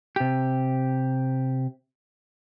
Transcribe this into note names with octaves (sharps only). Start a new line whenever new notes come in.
C3 G4